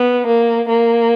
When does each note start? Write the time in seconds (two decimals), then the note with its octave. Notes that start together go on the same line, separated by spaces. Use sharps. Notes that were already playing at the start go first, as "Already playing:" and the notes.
Already playing: B3
0.26 A#3
0.69 A#3